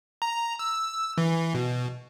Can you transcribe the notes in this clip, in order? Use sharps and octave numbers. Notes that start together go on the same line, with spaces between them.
A#5
E6
E3
B2